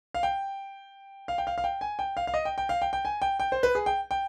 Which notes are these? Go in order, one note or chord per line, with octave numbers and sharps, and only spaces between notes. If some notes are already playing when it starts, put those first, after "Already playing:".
F5
G5
F5
G5
F5
F5
G5
G#5
G5
F5
F5
D#5
G5
G5
F5
G5
G5
G#5
G5
G5
C5
B4
G#4
G5
G5